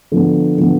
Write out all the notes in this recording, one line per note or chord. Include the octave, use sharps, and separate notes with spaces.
D3 F3 B3
D3 F3 B3